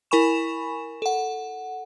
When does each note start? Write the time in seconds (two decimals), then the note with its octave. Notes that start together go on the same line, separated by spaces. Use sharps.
0.11 E4 A#4 G#5 B5 C#6 E7
1.02 A4 F#5